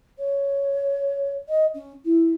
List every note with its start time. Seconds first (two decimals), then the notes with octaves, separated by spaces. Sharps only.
0.18 C#5
1.48 D#5
1.74 C#4
2.05 E4